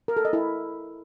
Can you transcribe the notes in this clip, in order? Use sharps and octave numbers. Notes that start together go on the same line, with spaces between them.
A#4
A4
D#5
E4